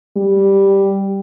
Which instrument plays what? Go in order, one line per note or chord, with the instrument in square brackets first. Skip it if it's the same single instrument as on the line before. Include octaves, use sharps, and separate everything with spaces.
[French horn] G3